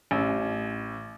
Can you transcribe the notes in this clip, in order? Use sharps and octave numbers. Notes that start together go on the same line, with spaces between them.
A1